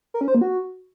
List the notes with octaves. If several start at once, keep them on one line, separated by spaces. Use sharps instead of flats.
A#4
C#4
C5
A#3
F#4